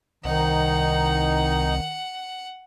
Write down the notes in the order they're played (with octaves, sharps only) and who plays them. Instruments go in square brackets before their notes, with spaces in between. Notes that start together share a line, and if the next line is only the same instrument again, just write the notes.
[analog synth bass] C2 [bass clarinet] D#3 [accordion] D#4 [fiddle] F#5